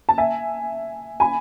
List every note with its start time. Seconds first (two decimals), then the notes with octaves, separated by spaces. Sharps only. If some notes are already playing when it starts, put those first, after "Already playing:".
0.09 A5
0.18 E5 G#5
1.20 G#5 B5